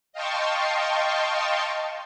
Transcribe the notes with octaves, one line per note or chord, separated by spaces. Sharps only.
D#5 F5 G5 A5 C6 C#6